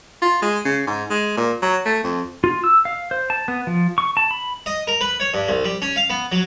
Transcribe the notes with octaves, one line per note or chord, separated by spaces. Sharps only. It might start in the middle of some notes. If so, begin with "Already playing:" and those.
F4
G#3
C#3
G#2
G#3
A#2
F#3
A3
F2
F4
E6
F5
C5
A5
B3
F3
C#6
A5
B5
D#5
A#4
B4
C#5
G2
C2
G3
C#4
F5
B3
F#3